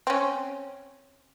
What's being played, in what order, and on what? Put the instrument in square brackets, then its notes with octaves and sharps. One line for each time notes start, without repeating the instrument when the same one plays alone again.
[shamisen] C4 C#4